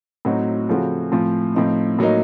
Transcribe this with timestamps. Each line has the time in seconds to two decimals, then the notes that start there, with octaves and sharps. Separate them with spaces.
0.25 A2 F#3 C4 D#4 F#4
0.69 C#3 F3 A3 C4 F#4
1.12 A2 F3 C4
1.55 A2 F3 C4 D#4
1.99 A2 F#3 A#3 D#4